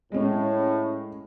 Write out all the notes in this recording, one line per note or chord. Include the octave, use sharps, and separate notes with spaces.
A2 G#3 C#4